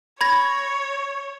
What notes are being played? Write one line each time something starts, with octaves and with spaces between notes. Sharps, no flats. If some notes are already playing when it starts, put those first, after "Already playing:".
C#5 B5 G#6 A#6